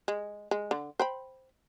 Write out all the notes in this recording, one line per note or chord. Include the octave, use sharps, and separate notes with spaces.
G#3
G#3
D3
C5 G5 B5